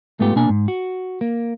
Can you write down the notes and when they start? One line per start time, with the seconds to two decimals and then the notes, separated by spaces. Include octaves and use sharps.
0.20 G#2 A3 B3 F4 G4
0.36 B2 A#3 D4 G#5
0.49 G#2
0.68 F#4
1.21 A#3